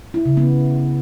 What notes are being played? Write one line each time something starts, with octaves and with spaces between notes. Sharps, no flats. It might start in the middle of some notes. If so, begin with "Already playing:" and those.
E4
C#3
B3